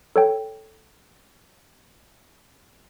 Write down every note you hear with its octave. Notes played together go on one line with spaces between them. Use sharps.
A4 C#5 G5